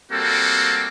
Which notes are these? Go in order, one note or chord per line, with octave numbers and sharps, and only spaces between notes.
G3 A#3 C4 F#4 A4